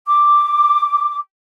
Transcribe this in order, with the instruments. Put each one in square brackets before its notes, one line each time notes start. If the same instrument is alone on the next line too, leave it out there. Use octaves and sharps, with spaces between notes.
[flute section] D6